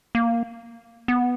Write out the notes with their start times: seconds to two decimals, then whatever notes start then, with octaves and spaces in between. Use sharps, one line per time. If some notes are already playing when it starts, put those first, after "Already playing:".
0.15 A#3
1.08 B3